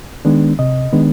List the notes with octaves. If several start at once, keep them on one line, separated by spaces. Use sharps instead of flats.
D#3 G#3 B3 D4
C3 D#5
D#3 G#3 B3 D4